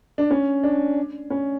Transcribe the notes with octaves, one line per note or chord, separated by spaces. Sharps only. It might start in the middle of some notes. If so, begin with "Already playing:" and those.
D4
C#4
D4
C#4